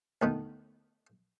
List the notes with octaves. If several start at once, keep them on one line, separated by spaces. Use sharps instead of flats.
D2 D#3 B3